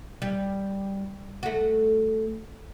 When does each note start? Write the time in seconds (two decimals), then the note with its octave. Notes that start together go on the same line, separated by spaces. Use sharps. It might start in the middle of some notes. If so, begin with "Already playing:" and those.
0.22 G3
1.43 A3 F#4